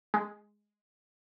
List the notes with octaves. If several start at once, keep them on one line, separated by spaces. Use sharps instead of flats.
G#3